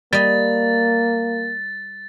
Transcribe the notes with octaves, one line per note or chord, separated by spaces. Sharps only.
G3 A#3 D#5 A6